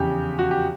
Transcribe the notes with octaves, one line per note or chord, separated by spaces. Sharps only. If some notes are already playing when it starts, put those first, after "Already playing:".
Already playing: F1 E2 C#3 G4
F#4
G4